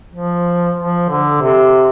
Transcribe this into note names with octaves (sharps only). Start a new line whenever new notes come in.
F3
F3
D3
C3